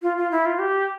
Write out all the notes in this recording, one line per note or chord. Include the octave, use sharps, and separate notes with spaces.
F4
F4
E4
F4
G4